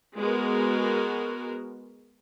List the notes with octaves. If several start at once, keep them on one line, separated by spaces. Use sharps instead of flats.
G#3 B3 F#4 A#4